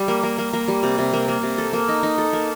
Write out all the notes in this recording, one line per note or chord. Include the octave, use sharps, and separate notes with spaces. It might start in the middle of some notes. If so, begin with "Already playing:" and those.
Already playing: G3
A#3
A#3
A#3
A#3
G3
C3
C3
A#3
A#3
C3
A4
A#3
D#4
D#4
A4
A#3